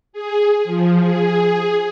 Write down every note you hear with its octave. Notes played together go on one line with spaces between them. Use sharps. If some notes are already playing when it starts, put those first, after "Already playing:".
G#4
F3
G#4